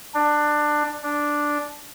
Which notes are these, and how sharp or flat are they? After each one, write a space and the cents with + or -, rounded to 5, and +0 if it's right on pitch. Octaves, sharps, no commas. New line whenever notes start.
D4 +20
D4 +0